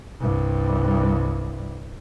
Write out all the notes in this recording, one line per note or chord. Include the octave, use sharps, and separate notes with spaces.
C2 G2